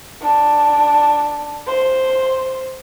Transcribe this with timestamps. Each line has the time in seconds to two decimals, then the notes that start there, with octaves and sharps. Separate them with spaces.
0.22 D4
1.67 C5